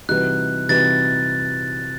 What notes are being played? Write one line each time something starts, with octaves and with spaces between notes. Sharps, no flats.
C3 E3 G3 D#4 F#4 F#6
C3 E3 G3 D#4 F#4 A6